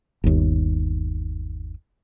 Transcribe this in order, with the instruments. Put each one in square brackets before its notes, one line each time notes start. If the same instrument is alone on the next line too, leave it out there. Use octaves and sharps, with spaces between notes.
[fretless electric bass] G1 D#2